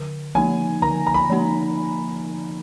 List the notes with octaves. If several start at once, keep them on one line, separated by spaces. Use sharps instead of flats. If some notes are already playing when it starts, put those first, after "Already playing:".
Already playing: D3
F3 A#3 D#4 G#5
D3 A#5
A#5
B5
F3 A#3 D#4